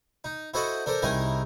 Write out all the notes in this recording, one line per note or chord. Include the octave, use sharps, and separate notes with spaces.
D#4
E4 F#4 A4 C5 D#5 F#5
D4 A4 A#4 C5
C2 D#3 D#4 E4 G#4 A#4